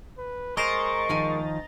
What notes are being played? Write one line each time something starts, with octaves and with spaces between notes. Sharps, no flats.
B4
G#3 A#4 C5 D#5 A#5 C#6 A6
D#3 F3 G#5